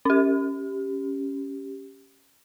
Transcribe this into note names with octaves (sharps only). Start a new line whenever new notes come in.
C#4 G4